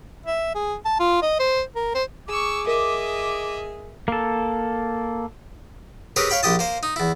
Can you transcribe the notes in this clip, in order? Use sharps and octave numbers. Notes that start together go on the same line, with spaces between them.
E5
G#4
A5
F4
D#5
C5
A#4
C5
G#4 C#6 D6 E6
A#4 D#5 E5
A#3 A4
C4 G4 G#4 A#4 B4 C#5
C#5 F5 G5 B5
A#1 G4 D#5 A5
A#3 C5
D#4
E2 E4